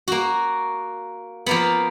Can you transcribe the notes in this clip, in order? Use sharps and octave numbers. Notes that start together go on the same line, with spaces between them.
A#3 F#4
F3 A#3 B3